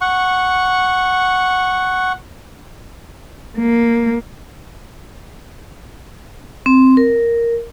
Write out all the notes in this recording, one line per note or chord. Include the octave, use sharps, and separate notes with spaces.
F#5 C#6
A#3
C4
A#4